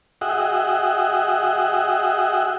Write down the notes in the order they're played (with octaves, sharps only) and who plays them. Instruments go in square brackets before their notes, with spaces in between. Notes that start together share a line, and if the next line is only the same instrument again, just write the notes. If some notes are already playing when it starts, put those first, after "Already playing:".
[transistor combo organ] F#4 G#4 D#5 E5 F#5 G5